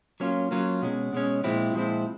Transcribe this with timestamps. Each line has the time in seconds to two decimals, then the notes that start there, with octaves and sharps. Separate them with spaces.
0.20 F#3 A#3 C#4 F4
0.51 F#3 A#3 C#4 F4
0.82 B2 G#3 C#4
1.13 B2 G#3 C#4
1.44 A#2 F3 G#3 C4 E4
1.74 A#2 F3 G#3 C4 E4